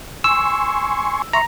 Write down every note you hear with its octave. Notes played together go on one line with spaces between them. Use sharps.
G#5 C6 C#6 E6
E5 A#5 C6 C#6